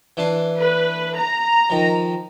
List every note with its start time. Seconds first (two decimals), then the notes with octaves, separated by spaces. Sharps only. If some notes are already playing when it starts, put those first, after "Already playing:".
0.17 E3 D4 C6
0.57 B4
1.17 A#5
1.70 D#3 F3